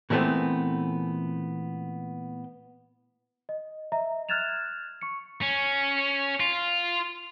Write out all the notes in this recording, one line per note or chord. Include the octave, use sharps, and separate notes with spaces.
A#2 E3 G3 A3 B3 C4
D#5
D#5 E5 A#5
F6 F#6 G#6 A6 E7 F7
C#6 C#7
C#4
F4